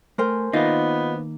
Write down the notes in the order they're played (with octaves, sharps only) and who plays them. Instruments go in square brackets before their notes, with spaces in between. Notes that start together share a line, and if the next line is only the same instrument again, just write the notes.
[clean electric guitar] A3 [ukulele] A#4 C5 G#5
[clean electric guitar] D#3 A#3 [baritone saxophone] B3 [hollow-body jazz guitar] D#4 F4